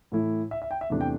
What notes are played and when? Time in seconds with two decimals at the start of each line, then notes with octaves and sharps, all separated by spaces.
0.12 A2 E3 A3 E4
0.51 E5
0.62 E5
0.71 G5
0.81 E5
0.90 E2 C3 A3 D4
1.01 G5